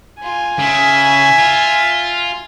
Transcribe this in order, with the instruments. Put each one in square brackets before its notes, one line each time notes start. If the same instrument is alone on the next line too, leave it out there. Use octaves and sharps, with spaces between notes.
[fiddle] F4 [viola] G#5
[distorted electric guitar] C#3 [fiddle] E5
[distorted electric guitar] F4